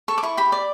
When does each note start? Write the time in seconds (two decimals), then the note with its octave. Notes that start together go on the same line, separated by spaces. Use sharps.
0.08 A4 C#6
0.18 D6
0.23 E4 C#6
0.37 G4 B5
0.52 D5